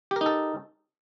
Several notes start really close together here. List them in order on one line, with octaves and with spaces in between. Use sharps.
G4 A#4 D#4 A4